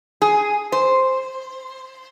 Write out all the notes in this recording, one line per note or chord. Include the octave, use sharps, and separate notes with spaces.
G#4
C5